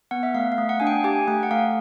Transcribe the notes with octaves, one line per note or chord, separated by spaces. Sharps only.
B3 F#5
E5
A3 F5
F5
A3
F#5
D4 G#5
G5
G4 G#5
A3 G5
F#5
A3 F5